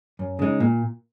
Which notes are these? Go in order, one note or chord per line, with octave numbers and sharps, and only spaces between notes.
F#2
C#3 G#3 D#4
A#2